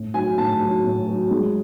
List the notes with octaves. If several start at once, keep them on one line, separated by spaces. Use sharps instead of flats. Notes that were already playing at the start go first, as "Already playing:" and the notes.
Already playing: A2
F#3 G#5
A2 A5
F#3
A2
F#3
G#3